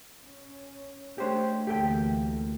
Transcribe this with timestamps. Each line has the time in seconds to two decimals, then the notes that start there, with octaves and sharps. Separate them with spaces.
0.23 C#4
1.18 A3 D4 E4 G4 C5 C#5
1.67 D2 E3 A#3 G4 A4 G5